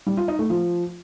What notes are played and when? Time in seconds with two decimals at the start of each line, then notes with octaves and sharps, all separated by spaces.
0.07 G3
0.17 F4
0.28 D#4
0.39 A3
0.50 F3